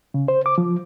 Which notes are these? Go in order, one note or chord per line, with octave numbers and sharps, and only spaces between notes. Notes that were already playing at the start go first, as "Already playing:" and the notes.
C#3
C5
D6
F3